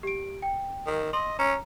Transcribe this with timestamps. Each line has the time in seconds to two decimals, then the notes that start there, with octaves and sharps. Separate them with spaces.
0.03 G4 D7
0.42 G5
0.86 D#3
1.13 D#5 C6
1.39 C#4 A#5